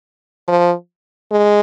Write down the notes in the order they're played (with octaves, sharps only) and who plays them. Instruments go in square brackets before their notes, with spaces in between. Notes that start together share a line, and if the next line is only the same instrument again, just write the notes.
[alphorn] F3
G#3